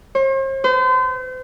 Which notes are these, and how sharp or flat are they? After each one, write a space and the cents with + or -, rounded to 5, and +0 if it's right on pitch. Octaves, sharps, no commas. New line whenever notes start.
C5 +45
C5 -40